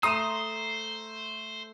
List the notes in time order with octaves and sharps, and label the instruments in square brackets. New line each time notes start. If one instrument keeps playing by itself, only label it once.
[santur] A3 C6 [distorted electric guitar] C5 [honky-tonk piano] A#5 E7 [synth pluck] D#6